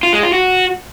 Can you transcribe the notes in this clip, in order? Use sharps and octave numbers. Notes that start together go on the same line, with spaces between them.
F4
G#3
F4
F#4